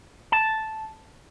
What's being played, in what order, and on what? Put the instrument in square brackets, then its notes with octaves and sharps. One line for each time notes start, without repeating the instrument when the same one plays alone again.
[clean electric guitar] A5